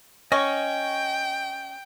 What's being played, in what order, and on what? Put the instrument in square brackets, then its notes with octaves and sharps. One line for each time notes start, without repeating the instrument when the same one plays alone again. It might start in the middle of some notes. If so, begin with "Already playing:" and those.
[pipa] C#4 [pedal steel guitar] D#5 C#6 [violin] G5